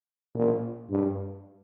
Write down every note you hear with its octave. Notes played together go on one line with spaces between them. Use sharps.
A#2
G2